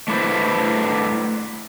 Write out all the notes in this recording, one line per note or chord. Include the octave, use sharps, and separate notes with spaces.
A3 D4 E4 B4 C5